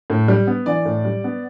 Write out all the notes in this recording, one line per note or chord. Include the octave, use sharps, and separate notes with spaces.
A2
G3
B3
E3 D5
A2
G3
B3